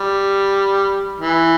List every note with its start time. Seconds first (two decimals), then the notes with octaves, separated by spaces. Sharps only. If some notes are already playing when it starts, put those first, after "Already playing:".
Already playing: G3
1.20 E3